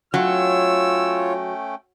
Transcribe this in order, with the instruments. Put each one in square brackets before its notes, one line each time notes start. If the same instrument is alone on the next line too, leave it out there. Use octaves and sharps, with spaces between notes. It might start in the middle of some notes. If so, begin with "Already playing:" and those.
[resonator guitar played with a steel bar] F#3 [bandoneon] A3 C#4 G5 [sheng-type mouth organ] F4 C#5 [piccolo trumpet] E6